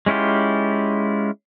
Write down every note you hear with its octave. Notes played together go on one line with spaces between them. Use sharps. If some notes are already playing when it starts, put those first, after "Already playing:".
G#3 C#4 E4 F4 G4